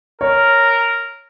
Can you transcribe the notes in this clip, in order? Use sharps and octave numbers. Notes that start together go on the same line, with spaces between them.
A#4 C#5